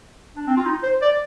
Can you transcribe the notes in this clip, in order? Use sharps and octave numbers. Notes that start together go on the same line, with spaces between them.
D4
C4
F4
D#4
C5
D5